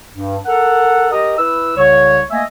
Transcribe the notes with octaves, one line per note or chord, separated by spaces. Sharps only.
G2
A4 A#4 F#5
G4 A#4 D#5
E4 B4 E6
C2 C#3 C#5
A3 A#3 D#5 E5 G#5